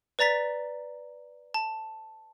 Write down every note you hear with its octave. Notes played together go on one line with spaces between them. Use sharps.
B4 D5 A#5 A6 B6
A5